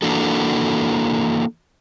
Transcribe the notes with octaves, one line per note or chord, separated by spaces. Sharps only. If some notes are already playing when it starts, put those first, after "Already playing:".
E3 A#3 D4 F#4 A4